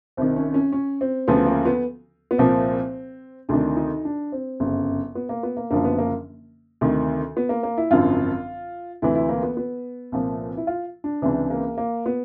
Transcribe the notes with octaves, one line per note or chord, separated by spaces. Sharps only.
C2 C3 D#3 C4
C#4
C#4
C#4
C4
D2 C#3 F3 B3
A#3
B3
B3
C2 A#2 F3 C4
D2 C3 D#3 D4
D#4
D4
C4
G1 F#2 C#3
B3
A#3
B3
A#3
F#1 F#2 D3 F3 A#3
B3
A#3
D2 C3 D#3
B3
A#3
A#3
E4
G#1 F#2 D3 F3 F4
D2 C3 E3 E4
E4
A#3
B3
B3
C2 A#2 F3
E4
F4
D4
C#2 C3 E3 D4
A#3
A#3
B3